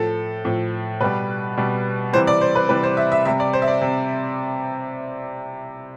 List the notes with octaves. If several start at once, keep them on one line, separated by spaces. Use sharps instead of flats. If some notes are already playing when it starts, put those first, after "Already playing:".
Already playing: A2 F3 A4
A2 F3
B2 G3 B4
B2 G3
C3 E3 G3 C5
D5
C5
B4
C3 E3 G3 B4
C5
E5
E5
C3 G3 E5
D5
C5
E5
D5
C3